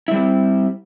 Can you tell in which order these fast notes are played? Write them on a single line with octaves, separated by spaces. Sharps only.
E4 G3 C4